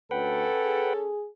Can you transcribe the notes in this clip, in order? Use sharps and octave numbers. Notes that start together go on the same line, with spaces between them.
D2 C#4 A4 B4 F#5 G5
G#4